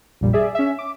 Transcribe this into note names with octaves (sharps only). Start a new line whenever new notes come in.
A#1 F2 A#2 G3
G#4 D5 E5
C#4 E5
D6